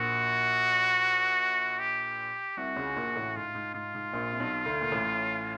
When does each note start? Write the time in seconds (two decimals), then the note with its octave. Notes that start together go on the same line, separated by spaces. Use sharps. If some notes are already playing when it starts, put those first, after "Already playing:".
Already playing: A#1 A#2 F#4
1.79 G4
2.57 C2 C3 F#4
2.76 C#2 C#3
2.96 A#1 A#2
3.16 A1 A2
3.36 G#2 F4
3.55 G#2
3.74 G#2 F4
3.95 G#2
4.13 A#1 A#2
4.32 C3
4.40 B1 B2
4.66 D2 D3
4.81 A#2
4.91 A1 A2